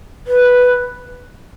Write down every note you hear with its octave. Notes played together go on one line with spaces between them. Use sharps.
B4